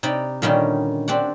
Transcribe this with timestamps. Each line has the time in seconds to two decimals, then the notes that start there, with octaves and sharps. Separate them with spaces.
0.03 C3 D#4 D5 B5
0.42 A#2 D3 D#3 G3 C#4 D#4
1.08 C4 D4 G4 D5 F#5